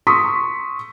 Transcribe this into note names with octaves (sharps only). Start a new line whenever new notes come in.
C6 C#6 D#6 E6 B6